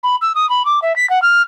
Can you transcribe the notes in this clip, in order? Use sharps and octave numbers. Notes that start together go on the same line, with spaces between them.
B5
E6
D#6
B5
D6
E5
B6
F#5
F6